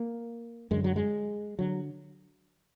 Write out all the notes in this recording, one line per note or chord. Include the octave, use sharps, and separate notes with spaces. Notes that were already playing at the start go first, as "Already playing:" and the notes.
Already playing: A#3
F#2 D3 G#3
F#3
G#3
D3 F#3